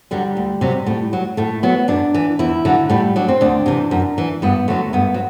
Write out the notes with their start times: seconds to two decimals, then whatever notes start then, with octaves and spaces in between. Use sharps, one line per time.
0.11 D3 F#3 G3
0.37 D2
0.61 C3 F#3
0.86 A2
1.13 F#3
1.37 A2 A3
1.63 F#3 B3
1.88 F#2 D4
2.14 E3
2.39 E2 E4
2.65 D3 F#3
2.90 A2 G3
3.16 F#3 D4
3.28 C4
3.41 D2 D4
3.66 C3 E3
3.91 F#2
4.18 E3
4.42 G2 B3
4.68 D3 F#3 A3
4.93 G2 B3
5.14 F#3